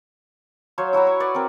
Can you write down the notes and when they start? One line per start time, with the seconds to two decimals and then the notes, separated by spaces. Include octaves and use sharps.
0.78 F#3 C5 C#5 F5
0.93 E4 F#4 A#5 B5
1.07 C#6
1.20 B4 D5 F#5
1.35 C4 A#4